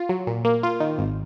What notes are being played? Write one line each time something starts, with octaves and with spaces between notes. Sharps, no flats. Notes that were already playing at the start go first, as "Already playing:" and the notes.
Already playing: F4
F#3
A#2
A#3
F4
D#3
G#1